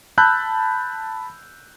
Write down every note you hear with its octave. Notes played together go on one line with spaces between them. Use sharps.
A5 B5 E6 F#6 G6